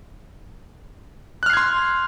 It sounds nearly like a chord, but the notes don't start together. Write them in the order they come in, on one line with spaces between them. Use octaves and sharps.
F#6 F6 C7 G#6 C6